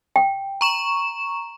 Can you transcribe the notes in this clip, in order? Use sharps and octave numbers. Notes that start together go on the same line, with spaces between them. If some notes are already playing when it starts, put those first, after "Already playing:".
G5
A#5 C#6 E7